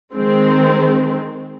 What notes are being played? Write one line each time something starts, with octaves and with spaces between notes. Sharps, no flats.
D#3 G#3 C4